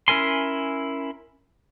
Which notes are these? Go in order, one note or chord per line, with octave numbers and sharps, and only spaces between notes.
C#4 E4 A#4 G#5 C6